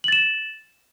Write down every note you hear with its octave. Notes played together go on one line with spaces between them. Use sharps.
A6 E7 F#7